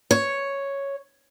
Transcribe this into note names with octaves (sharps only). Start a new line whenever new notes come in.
C#5